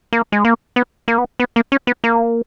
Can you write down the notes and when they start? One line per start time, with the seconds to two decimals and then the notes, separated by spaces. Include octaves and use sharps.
0.13 A#3
0.32 G#3
0.45 A#3
0.76 B3
1.08 A#3
1.18 B3
1.40 B3
1.56 A#3
1.72 C#4
1.87 B3
2.04 A#3